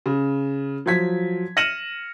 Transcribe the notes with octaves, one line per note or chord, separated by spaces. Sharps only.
C#3
F3 F#3 G#6 B6
F6 A#6 C#7 D#7 E7 F#7